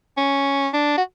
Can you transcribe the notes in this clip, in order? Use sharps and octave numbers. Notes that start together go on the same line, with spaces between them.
C#4
D4
F#4